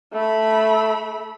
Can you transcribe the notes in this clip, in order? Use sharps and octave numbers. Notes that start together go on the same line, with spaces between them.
A3 B5